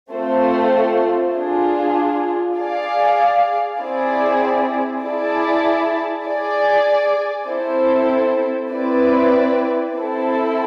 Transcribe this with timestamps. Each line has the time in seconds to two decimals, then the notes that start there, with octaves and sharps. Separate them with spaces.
0.11 A3 C4 F4 A4 C5
1.34 D4 F4 G#4
2.57 G#4 D5 F5
3.79 C4 E4 G#4 D5
5.02 E4 G#4 D5 A5
6.25 G#4 D5 G#5
7.47 C4 E4 A4 C5
8.71 C4 E4 B4 D5
9.94 C4 E4 A4